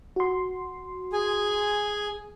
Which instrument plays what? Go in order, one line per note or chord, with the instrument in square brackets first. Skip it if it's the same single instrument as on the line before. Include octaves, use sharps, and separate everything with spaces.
[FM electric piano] F#4 C6
[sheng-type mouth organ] G#4 G#5